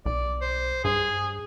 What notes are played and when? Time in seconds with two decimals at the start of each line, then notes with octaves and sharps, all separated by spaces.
0.06 B1 D5
0.41 C5
0.85 G2 G#4